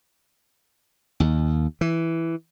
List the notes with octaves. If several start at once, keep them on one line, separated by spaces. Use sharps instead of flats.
D#2
E3